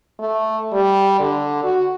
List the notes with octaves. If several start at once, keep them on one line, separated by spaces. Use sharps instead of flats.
A3
G3
D3
F#4